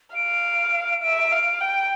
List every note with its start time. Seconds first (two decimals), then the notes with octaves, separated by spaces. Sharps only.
0.15 F5 D7
1.03 E5
1.31 F5
1.61 G5